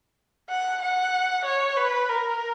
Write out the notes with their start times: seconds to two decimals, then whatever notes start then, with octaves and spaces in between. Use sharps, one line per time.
0.50 F#5
0.82 F#5
1.45 C#5
1.77 B4
2.09 A#4